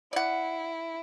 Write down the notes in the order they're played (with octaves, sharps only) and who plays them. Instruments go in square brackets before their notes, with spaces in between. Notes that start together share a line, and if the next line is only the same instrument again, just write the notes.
[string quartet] E4 [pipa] D5 F#5